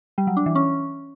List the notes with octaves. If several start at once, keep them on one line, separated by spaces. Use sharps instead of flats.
G3
F#3
D4
E3
C#4